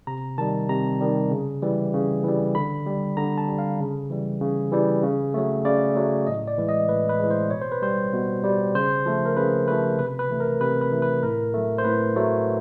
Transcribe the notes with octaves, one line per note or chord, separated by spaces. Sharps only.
C3 A#5
D#3 G3 A5
C3 A#5
D#3 G3
C#3
E3 G3
C#3
E3 G3
D3 B5
G3
D3 A#5
A5
G3
F5
C#3
E3 G3
C#3
E3 G3
C#3
F#3 A3
C#3 D5
F#3 A3
A2 D#5
D5
E3 G#3
D#5
A2 B4
B4
E3 G#3
C5
B2 C#5
C5
B4
G3 C5
B2
G3
C#3 C5
F3 A3
A#4
C#3 B4
F3 A3 B4
C3 B4
B4
E3 A3
A#4
C3 B4
B4
E3 A3
B4
A2 A#4
F#3 A3
C5
A2 B4
F#3 A3